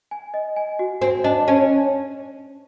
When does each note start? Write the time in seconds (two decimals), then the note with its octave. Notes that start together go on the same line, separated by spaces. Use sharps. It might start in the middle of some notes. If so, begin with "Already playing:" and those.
0.11 G#5
0.34 D#5
0.56 G#5
0.79 F#4
1.02 C4 G#5
1.24 D4 D#5
1.48 C#4 G#5